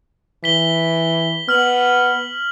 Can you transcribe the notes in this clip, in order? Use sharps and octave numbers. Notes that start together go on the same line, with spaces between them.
E3 B6 G7
B3 F6 F#7